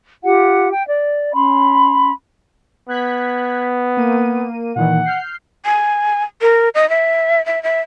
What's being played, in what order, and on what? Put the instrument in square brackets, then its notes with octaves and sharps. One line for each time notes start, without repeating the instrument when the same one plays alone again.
[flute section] F4 G4 F#5
G5
D5
C#4 B5 C6
[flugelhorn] B3 [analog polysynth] F#6 G#6 B6
[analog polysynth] A#3 D#7
[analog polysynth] A#2 D#3 E3 [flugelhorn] F#5
[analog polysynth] F6 G6 C7
[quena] G#5
A#4
D#5
E5
E5
E5